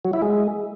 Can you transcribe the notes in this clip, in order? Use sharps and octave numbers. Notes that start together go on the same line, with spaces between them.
F#3
E4
G#3